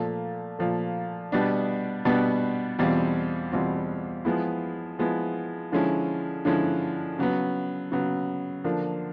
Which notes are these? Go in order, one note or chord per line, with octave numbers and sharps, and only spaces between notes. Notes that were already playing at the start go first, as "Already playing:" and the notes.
Already playing: A#2 F3 A3
A#2 F3 A3
B2 G3 B3 D4
B2 G3 B3 D4
E2 B2 G3 C4 F4
E2 B2 G3 C4 F4
F3 G#3 B3 E4
F3 G#3 B3 E4
D3 F3 G#3 C#4 E4
D3 F3 G#3 C#4 E4
C#3 F#3 B3
C#3 F#3 B3
D3 F3 A#3 D4